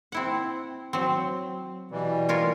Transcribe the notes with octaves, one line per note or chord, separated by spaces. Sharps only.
C4 E4 F#5
F#3 C4
B2 E3 G3
F4 A#4 C#5